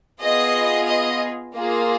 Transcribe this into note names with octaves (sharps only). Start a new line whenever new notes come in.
B3 F4 G#4 D#5
D#5
A#3 F4 G#4